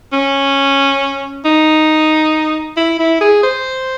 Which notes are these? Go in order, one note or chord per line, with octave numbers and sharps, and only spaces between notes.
C#4
D#4
E4
E4
G#4
C5